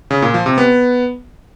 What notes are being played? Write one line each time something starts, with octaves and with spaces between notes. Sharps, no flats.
C#3
A#2
F3
C3
B3